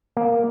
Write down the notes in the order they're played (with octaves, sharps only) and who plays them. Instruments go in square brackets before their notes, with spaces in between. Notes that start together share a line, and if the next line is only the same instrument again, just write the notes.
[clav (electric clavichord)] A#3